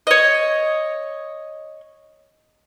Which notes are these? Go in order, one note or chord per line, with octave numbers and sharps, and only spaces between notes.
C#5 D#5